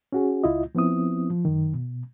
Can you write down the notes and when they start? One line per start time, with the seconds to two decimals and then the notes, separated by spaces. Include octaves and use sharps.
0.12 C#4 F#4 G#4
0.44 C#2 E4 F4 D#5
0.75 F3 B3 C4 E4 D#6
1.30 F3
1.45 F#2 D#3
1.74 B2